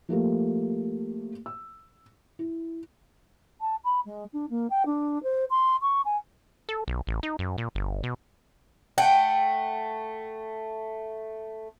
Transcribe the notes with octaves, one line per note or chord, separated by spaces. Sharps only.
F3 A3 A#3 G4
E6
E4
A5
B5
G#3
D4
A#3
G5
D4
C5
C6
C#6
G#5
A4
B1
A1
D#4
F#2
A#2
G1
B2
A3 F#5 G5